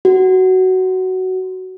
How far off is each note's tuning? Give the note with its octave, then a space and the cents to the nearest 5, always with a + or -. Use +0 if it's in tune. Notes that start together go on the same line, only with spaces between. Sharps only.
F#4 +15